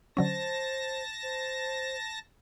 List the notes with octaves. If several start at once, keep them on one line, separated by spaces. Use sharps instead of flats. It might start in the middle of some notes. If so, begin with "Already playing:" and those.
D3 F#3 C#4 C5 A5 A#6
C5